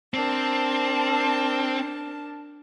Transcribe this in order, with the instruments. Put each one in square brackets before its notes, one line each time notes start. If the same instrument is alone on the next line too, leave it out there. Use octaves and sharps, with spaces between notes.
[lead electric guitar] C4 [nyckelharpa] D4 A#4 [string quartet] A5